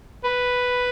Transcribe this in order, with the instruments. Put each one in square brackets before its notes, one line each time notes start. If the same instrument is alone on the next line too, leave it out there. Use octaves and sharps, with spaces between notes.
[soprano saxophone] B4